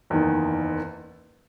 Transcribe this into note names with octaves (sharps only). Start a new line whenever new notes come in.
F#1 E2 D#3